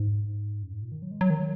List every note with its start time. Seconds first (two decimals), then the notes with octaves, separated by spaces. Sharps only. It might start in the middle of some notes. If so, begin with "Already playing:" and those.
Already playing: G#2
0.63 F#2
0.73 G#2
0.82 A#2
0.92 D#3
1.02 F#3
1.11 G#3
1.21 F#3
1.30 D#3
1.40 F#3